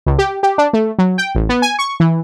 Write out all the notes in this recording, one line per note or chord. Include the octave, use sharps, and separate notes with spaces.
C#2
G4
G4
D4
A3
F#3
G5
A1
B3
G#5
C#6
E3